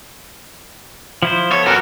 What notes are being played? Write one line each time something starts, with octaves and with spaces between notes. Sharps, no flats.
F3 E4 C5
B3 A4 C#5
F#4 A#4